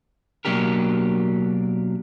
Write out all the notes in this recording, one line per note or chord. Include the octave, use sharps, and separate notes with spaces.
B2 F#3 A#3 D4 G4 A#4